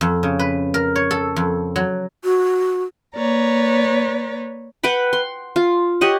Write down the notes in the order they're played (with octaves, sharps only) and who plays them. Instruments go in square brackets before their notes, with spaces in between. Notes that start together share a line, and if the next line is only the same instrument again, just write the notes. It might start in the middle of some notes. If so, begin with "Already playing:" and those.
[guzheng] F2
C#3
B4
A#4
C#5
A4
F2
F#3
[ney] F#4
[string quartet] A#3 B4 C#5 D5 A#5
[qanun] B4 F#5 G5 B5
C6
F4
G4 C#5 D#5 F#5